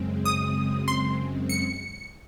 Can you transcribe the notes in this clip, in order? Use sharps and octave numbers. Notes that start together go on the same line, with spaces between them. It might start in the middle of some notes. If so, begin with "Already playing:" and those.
Already playing: F#2 C#3 G#3 C4
D#6
C6
C#7